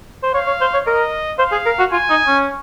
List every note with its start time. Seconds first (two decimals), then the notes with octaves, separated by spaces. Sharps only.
0.23 C5
0.34 C#5 F5
0.47 C#5
0.61 C5
0.74 C#5
0.87 A#4 D#5
1.39 C5 F5
1.52 G#4
1.66 A#4
1.79 F#4
1.92 F4 G#5
2.10 D#4
2.27 C#4